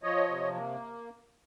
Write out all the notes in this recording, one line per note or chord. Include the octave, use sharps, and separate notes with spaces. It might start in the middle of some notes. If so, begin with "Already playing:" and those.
F3 C#5 D#5
C3
A#3